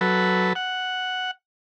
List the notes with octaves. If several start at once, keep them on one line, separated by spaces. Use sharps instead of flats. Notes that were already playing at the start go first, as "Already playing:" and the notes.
F#3 A4 B4
F#5